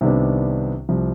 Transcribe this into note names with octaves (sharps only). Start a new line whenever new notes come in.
C2 C3 D#3 B3 D4
C2 C3 F3